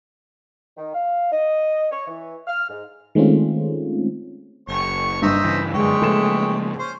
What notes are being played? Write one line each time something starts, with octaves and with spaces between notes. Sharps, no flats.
D#3
F5
D#5
C#5
E3
F6
G#2
D#3 G#3 A3 C4 C#4 F4
F#1 C#5 C#6
G2 D#4 C5 E5
C#3 E3
F#2 D3 E3 G#3 C#5 G5
C#3 F3 A3 A#3 C6 E7
C#4 C5